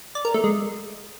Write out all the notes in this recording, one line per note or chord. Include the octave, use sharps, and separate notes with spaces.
D5
A#4
A3
G#3